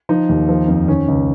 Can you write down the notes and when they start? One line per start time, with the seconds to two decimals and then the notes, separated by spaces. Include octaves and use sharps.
0.09 F3 D#4
0.29 D#2
0.49 F3
0.68 F2
0.88 D#3 C#4
1.08 C#2